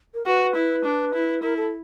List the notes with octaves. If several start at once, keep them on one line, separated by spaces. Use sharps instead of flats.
A#4
F#4 B4
E4
D4
E4
E4 A#4
A4